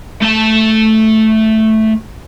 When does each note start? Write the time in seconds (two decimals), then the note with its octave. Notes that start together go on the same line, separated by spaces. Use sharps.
0.22 A3 A5